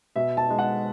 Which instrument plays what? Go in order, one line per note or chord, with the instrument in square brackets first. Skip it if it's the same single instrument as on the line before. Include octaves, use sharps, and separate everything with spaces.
[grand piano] B2 E5
A5
G#3 D#4
F#5